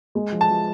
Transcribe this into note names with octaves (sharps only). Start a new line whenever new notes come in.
G#3
F3
A5
F3